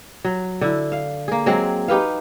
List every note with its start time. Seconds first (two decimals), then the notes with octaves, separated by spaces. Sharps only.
0.24 F#3
0.61 D3 E4
0.92 F5
1.28 A#3 G#4
1.46 F#3 G#3 C4
1.88 D#4 G4 B4 F5